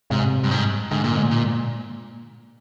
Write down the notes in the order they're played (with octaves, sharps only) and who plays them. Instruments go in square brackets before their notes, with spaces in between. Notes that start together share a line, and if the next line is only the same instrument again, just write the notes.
[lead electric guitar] G#2 [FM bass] C3
[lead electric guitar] G2
G#2
[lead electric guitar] G#2 [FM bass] D3
[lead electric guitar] A#2
G#2
A#2